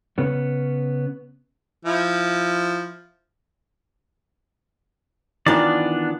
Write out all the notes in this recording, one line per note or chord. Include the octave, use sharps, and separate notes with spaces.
C#3 B3 C#4 C#5
F3 E4
D#3 E3 B3 D4 F4 D5